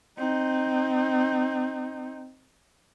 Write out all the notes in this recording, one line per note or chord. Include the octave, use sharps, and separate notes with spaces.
C4 D#4